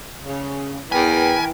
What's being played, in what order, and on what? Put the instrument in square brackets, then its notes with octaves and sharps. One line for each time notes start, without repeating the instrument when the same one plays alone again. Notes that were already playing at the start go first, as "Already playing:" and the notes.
[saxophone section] C#3
[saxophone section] E2 [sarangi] E3 [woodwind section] A#4 B4 G5 [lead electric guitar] G#5